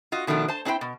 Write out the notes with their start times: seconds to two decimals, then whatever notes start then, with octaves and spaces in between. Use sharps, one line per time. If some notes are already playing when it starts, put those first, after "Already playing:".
0.12 F4 F#4 D#5
0.27 B2 D#3 F3 A3 D4
0.48 C5 A5
0.65 C4 D4 E4 C5 G5
0.81 B2